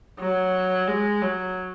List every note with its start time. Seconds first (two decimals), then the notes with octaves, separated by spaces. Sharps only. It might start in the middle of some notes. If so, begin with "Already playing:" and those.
0.20 F#3
0.88 G#3
1.22 F#3